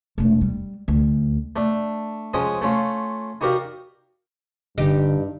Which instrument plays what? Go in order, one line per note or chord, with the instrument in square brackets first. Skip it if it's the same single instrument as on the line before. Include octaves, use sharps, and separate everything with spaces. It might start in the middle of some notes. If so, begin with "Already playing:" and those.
[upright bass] E1 A3
G3
D2
[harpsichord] A3 D4
F3 G#3 C#4 D#6
A3 C#4 F4
D#4 F#4 G4 A#4 D5 F5
[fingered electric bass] G1 D3 [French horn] G2 [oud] D#4 G4